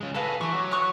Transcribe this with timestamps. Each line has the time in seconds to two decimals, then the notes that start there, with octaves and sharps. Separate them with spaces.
0.01 C#3 G#3
0.15 F#4 G#4 A4 B4 F5
0.41 E3 G4 C#6
0.54 F#3
0.71 C#6 D#6 F#6